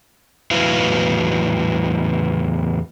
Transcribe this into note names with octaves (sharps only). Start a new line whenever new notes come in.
E2 A2 F#3 E4 B4 F5